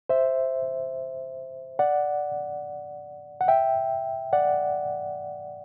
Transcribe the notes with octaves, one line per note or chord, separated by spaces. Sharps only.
C5 E5
D5 F#5
F#5
E5 G5
D5 F#5